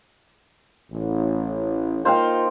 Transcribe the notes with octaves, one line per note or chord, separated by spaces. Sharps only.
A1
A#3 D#4 F4 C5 F5 G5